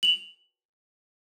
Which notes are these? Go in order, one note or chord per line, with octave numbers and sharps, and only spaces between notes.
F7 F#7